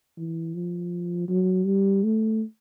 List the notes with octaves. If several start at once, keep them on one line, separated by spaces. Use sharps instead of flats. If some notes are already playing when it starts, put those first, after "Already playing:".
E3
F3
F#3
G3
A3